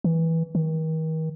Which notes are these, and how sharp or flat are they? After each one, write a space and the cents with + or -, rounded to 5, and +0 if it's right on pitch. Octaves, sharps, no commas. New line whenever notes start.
E3 -15
D#3 +40